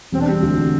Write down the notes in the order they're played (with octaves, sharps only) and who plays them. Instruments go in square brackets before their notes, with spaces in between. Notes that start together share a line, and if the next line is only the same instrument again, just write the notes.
[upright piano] E1 [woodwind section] C4
[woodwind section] D4
[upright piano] G3 [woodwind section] C4
[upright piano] D2
D3